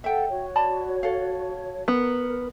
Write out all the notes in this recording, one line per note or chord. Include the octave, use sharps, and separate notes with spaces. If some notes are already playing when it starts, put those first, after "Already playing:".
A4 E5 F#5 G5
F#4 C#5
D5 A5 B5
A4 F5
B3 A#4